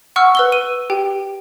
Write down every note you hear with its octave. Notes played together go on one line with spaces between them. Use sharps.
F#5 C#6 E6 F6
B4 E6 G7
D#7
G4 G5